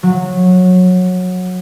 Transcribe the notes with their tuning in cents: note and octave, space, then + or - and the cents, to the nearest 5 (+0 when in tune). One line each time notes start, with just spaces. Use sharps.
F#3 -20